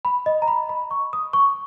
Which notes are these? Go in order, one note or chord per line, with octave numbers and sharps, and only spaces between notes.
B5
D#5
A#5
B5
B5
C#6
D#6
C#6